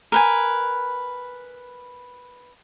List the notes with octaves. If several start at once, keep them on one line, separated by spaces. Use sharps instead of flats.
A#4 B4 G#5